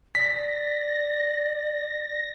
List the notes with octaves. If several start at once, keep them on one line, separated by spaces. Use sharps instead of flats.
D5 A#6 B6